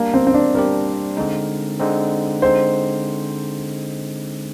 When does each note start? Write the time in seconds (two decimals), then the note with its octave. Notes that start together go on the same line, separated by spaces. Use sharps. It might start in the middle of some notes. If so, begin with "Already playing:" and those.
Already playing: G3 A#3 D4 G4
0.14 C4
0.27 C4
0.34 D4
0.55 G3 D4 G4 A#4
1.17 D3 G#3 C4 D#4
1.80 D3 G#3 C4 D#4
2.42 D3 G#3 C4 D#4 C5